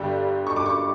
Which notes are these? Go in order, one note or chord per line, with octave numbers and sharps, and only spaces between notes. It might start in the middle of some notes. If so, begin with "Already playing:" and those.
Already playing: G1 G2 D3 G3
C#6
D6
C#6